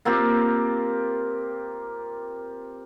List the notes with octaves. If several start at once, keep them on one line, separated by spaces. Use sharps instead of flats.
A#3 C4 F4 G4